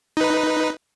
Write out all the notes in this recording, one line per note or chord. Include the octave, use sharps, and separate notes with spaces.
D#4 B4